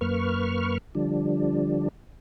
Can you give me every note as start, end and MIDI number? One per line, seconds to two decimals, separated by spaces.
0.01 0.78 42
0.01 0.78 58
0.01 0.78 71
0.01 0.78 85
0.01 0.78 89
0.95 1.88 50
0.95 1.88 53
0.95 1.88 55
0.95 1.88 62